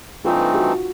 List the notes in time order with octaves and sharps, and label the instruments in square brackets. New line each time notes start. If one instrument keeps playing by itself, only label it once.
[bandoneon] G2 E3 A3 C4 D#4 [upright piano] F4
[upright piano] F#4